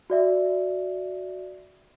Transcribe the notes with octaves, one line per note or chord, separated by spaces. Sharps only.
F#4 D5 E5